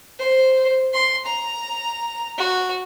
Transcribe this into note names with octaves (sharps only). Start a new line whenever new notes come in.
C5
C6
A#5
F#4